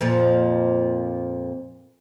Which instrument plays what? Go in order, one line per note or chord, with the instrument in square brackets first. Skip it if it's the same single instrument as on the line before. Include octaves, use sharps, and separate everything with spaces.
[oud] F2 A#2 F3